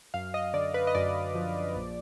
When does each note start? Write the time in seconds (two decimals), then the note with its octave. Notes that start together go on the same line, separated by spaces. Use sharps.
0.14 F#2 F5
0.34 D#5
0.54 D3 D5
0.74 B4
0.87 D#5
0.95 F#2 D5
1.35 F3
1.76 A#1